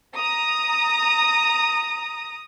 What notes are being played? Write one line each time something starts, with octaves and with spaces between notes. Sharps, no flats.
A#5 D#6